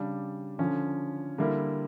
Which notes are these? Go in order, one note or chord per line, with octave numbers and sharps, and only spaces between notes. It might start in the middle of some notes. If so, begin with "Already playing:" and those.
Already playing: C#3 G3 D4
D3 F3 C#4
D3 G3 A#3 E4